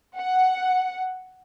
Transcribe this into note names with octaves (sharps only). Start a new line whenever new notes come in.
F#5